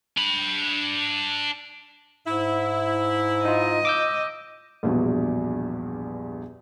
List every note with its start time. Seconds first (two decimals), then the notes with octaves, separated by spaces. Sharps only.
0.18 D4 B5
2.27 G#2 E4
3.45 D#4 F4 D#5
3.85 D6 E6 G6
4.83 A#1 E2 G2 B2